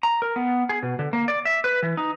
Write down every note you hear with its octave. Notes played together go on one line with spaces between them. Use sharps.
A#5
A#4
B3
G#4
B2
D3
A#3
D5
E5
B4
E3
D#4